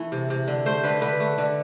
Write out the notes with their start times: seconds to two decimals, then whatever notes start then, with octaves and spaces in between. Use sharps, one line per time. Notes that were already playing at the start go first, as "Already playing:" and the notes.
Already playing: E3 A3
0.12 C3
0.30 C3
0.48 D3
0.66 A3 C5
0.83 D3 B4
1.01 D3 B4
1.20 A3
1.38 D3